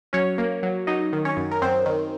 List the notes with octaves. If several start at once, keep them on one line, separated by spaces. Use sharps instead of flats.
F#3 C#4 C#5
A#3
F#3
F#3 D#4 D#5
D#3
C#4 C#5
F#2
A#4
F#2 C4 C5
D#3